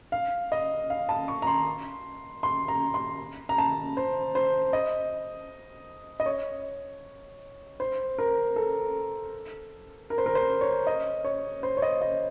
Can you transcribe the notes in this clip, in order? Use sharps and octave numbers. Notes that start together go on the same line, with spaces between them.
F5
D#5
F5
A5
C#6
A#5
C6
C6
A#5
C6
A#5
A5
C5
C5
D#5
D#5
C#5
C5
A#4
A4
A#4
C5
A#4
C5
C#5
D#5
C#5
C5
C#5
D#5
D#5